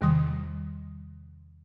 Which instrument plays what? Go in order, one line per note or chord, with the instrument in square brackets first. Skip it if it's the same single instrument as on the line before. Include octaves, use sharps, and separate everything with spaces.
[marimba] E2 C3 D#3 G3 C6 D#6